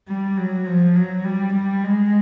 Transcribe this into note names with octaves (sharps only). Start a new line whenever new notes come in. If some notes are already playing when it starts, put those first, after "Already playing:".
G3
F#3
F3
F#3
G3
G3
G#3